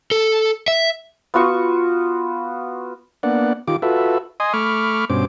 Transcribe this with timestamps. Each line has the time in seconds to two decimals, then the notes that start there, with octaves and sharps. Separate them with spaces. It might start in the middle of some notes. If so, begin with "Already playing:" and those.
0.11 A4
0.68 E5
1.34 B3 F4 F#4 C#6
3.23 A#3 B3 D4 D5 F#5
3.68 D#3 F4 G4 D6
3.82 F4 F#4 A4 B4 E5
4.40 D#5 G#5 C6 D#6
4.53 A3 B5 C#6 D6 F6
5.10 G2 B2 C#4 C5 D6